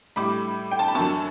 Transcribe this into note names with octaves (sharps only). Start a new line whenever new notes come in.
A2 G3 B5 D6
G5
A5
B5
F#2 D3 F#3 A5 C#6